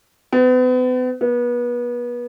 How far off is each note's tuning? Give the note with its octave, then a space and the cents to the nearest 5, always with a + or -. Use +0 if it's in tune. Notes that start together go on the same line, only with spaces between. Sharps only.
B3 +40
B3 -30